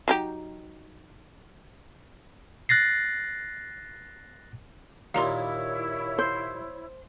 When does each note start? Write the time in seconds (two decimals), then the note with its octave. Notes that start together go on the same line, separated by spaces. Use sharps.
0.08 F#3 D#4 G4
2.69 F#6 A6 A#6 C7
5.14 D#2 A#2 E4 C#5 F5 A#5 C6
6.19 C5